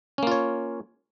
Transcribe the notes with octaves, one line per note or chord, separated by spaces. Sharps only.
A#3 C#4 F4 C#5